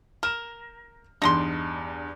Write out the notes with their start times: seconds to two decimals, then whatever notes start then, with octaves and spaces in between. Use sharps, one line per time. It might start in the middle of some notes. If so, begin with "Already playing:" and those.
0.23 A#4 F6 E7
1.22 E2 G2 D#4 A#5 C6